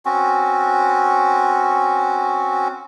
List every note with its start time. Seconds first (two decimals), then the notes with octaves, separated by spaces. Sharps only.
0.05 C4 C#4 F#4